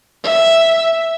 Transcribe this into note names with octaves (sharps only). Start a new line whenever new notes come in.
E5